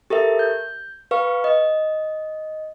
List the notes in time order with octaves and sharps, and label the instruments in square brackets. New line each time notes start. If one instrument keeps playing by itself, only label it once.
[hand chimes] G4 A4 A#4 E5
G6
B4 F5 C#6
D#5